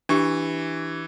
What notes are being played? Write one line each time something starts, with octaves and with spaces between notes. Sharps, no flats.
E3 D4 G4 C#6